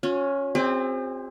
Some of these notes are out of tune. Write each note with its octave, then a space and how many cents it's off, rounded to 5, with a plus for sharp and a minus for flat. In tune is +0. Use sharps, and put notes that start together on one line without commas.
C#4 +0 F4 +45
C4 +0 G#4 -45 D#5 -45